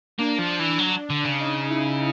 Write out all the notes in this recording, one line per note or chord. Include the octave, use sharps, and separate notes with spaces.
A#3 D4
F3
E3
F#3
D3
C#3
D#4
E4